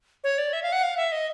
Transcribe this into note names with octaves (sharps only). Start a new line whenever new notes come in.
C#5
D5
E5
F5
F#5
F5
E5
D#5